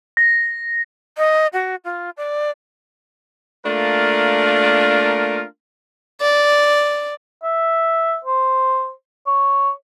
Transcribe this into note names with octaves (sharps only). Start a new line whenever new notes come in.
A#6
D#5
F#4
F4
D5
A3 A#3 D4 F4 A#4
D5
E5
C5
C#5